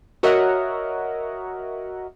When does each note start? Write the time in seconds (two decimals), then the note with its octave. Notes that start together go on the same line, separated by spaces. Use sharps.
0.23 F#4 A#4 C#5 D#5 E5 F#5